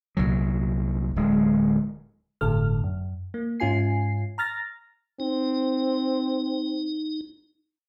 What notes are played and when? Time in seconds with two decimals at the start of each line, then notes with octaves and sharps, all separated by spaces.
0.17 C2 A#2 F#3
1.16 D1 G#3
2.41 G1 A2 D3 A4 F6
2.84 F#2
3.34 A#3
3.60 G#2 C#4 F4 G#5 C7
4.38 A#5 F6 A6 A#6
5.20 C4 D#4